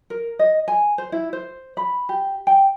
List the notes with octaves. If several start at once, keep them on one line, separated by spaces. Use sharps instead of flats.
A#4
D#5
G#5
C5
E4
C5
B5
G4
G5